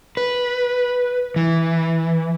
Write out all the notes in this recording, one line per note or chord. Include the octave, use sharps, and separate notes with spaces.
B4
E3